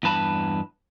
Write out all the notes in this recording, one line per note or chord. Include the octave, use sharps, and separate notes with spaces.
E2 G2 B4 A5 B5